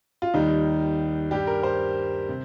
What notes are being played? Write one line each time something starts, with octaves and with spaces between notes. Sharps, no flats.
F4
D#2 D#3 G3 D#4
G2 G3 G4
A#4
C5
C3